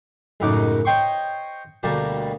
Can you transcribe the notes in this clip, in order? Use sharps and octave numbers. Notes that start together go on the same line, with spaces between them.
C#2 F#2 A2 D#4 F#5 D6
C5 C#5 D#5 G5 C6 C#6
D2 B2 G3 A#3 G4 A5